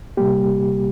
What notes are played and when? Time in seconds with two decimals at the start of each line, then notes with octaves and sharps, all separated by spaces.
0.17 C3 G3 A#3 G4